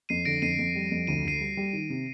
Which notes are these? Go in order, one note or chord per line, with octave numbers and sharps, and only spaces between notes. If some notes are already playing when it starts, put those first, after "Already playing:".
F2 C7 D#7
D3 A#6 D7
F2 C7 D#7
F2
G3
F2
D2 D#7
D2 C7 D#7
G3
G3
D#3
C3